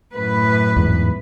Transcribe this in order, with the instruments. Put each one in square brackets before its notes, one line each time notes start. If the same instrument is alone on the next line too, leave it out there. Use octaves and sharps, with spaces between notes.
[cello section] F#2 A2 B4
[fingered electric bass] E2 G#2